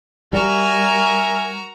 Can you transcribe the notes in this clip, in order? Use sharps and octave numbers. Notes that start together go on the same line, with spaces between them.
G3 F#4 A#4 E5 G#5 A#5